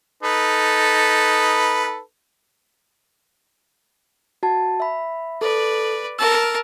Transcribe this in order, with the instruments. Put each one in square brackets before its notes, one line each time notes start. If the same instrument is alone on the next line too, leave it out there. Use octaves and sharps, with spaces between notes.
[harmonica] D#4 A4 B4
[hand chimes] F#4 A5
E5 B5
[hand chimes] A4 [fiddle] B4 D5
[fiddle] A#4 A5 [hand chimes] E6